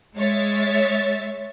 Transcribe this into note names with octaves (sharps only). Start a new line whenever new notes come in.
G#3 C#5 E5 A6